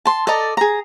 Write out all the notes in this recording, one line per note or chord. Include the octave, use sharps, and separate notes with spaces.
A5 C6
A4 D5 D#5 A#5
G#4 A#5